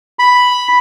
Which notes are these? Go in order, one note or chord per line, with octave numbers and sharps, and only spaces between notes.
B5